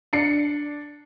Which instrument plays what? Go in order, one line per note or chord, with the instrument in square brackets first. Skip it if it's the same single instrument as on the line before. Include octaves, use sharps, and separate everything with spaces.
[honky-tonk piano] D4 C7 C#7